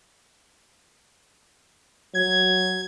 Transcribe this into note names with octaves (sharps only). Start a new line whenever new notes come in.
F#3 G#6